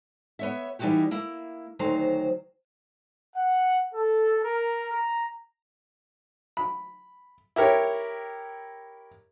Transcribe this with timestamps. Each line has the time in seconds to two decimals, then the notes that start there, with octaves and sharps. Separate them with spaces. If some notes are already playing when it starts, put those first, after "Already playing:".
0.39 B3 C#5 E5
0.79 E3 G3 D#4 E4 F#4 G4
1.11 A#3 E4
1.79 D2 D#3 F#3 C5 A#5
3.35 F#5
3.94 A4
4.43 A#4
4.90 A#5
6.57 B5
7.56 E4 G4 A#4 C#5